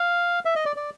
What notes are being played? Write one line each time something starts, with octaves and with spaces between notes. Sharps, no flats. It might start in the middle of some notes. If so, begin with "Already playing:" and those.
Already playing: F5
E5
D#5
D5
D5